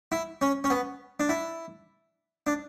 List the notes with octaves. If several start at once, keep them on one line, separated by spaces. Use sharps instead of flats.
E4
C#4
C#4
B3
D4
E4
D4